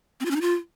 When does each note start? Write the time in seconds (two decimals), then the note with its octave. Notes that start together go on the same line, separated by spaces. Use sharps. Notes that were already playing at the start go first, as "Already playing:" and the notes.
0.20 C4
0.25 F4
0.31 C#4
0.36 D#4
0.41 F4